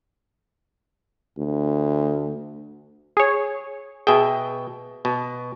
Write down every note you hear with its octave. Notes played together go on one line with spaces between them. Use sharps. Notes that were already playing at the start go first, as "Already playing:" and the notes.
D2
G#4 C#5
B2 G#4 E5 G5
B2